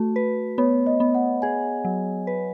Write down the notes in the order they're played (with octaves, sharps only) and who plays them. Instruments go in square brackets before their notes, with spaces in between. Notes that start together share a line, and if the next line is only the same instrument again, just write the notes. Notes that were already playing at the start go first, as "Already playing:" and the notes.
Already playing: [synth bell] A3 [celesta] F#4
[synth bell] B4
[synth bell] B3 [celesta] C#5
[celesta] D#5
[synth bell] B3
[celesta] F#5
[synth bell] G#4 [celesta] G#5
[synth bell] F#3
B4